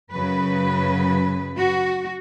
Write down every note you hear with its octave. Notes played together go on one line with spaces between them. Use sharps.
F#2 C#3 F#3 B4
F#4